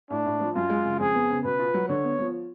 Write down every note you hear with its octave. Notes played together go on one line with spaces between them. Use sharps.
A2 D4
A2
F3
F#2 F4
G#3
C#3
F2 G#4
B3
C#3
B2 B4
F4
F#3
D3 C#5
B3
F3